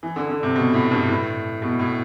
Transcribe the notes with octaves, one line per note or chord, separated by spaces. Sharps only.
E3
D3
D3
C3
B2
A2
G2
A2
B2
A2